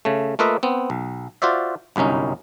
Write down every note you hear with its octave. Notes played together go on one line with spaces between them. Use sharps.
C#3 A3
A3 A#3 F4 B4 D#5 E5
B3 C4
B1
F4 F#4 C5 D5 E5
G1 C2 F#2 C#4 D#4